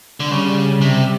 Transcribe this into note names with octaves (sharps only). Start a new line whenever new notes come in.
D3
C#3 G3
C3